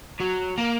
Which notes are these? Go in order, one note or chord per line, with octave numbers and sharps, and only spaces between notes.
F#3
A#3